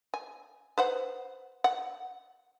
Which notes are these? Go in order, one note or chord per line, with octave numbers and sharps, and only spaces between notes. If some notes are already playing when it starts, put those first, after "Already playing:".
G#5
B4 C5 F#5
F#5